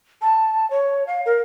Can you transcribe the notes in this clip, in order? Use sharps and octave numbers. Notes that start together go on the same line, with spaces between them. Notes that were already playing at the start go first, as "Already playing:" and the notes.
A5
C#5
F5
A#4